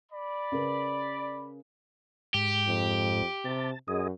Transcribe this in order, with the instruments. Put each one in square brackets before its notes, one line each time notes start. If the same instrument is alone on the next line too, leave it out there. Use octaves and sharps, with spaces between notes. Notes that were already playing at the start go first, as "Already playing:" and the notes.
[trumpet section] D5 B5
[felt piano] C#3 A#4 B4
[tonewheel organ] G#2 [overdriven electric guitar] G4
[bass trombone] F2
[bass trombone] C3 [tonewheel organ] A5
[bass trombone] F#2 [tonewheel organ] G#4 D#5